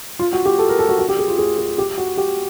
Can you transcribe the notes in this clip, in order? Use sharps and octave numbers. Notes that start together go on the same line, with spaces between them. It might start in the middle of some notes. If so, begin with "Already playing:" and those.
F4
F#4
G4
A4
A#4
A4
F#4
F#4
G4
G#4
F4
G#4
G#4
G4
F#4
G4